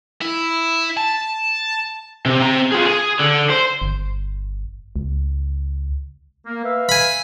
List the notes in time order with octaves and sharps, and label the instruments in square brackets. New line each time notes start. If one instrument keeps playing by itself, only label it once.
[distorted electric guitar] E4
A5
[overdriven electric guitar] C3
C4 A#5
F4 G#4
G#4
D3
C5
[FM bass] G1
C#2
[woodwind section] A#3
B4 E5 F5
[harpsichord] G#5 B5